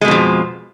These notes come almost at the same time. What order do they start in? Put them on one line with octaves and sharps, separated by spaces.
G#3 B2 F2 F3